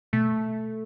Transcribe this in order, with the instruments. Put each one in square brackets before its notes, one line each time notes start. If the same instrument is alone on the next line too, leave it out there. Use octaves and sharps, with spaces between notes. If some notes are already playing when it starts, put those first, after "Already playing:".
[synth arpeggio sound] B2 [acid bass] A3